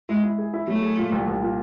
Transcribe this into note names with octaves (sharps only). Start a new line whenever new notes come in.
G#3 E4
E4
G#4
E4
F#3 A3
G#4
A#2
C2
C2
A#2